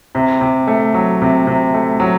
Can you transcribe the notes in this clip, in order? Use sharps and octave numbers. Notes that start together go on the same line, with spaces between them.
C3
C3
A3
F#3
C3
C3
A3
F#3